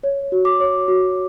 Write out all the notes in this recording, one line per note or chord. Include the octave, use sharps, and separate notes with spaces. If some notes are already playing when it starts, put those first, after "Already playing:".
C#5
F#4
D6
C#5
F#4